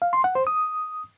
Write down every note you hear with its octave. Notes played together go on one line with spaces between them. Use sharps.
F5
C6
F#5
C5
D#6